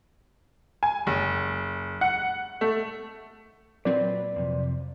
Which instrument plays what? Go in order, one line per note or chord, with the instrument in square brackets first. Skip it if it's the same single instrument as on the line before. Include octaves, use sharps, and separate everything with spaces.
[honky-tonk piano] G#5
F#1
F#5
A3
[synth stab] A#2 F#3 C4 [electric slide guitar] B4 [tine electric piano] D5
[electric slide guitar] F2 C3